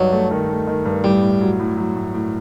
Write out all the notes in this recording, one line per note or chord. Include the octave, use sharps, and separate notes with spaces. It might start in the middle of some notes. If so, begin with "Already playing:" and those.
Already playing: G2 F#3 D#4
A3
D#3
A3
D#3
G2
A2 G3
A2
F#3
A2
F#3
A2
A2